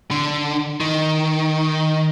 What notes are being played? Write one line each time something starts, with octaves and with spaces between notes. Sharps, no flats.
D3
D#3